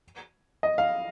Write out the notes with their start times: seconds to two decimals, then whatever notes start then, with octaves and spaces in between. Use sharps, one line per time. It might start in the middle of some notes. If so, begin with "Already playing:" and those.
0.63 D#5
0.78 F5